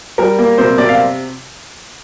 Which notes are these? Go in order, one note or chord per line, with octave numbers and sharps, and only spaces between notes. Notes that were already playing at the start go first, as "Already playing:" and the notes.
G3 A#4
A#3
C3 C5
C3 D5
F5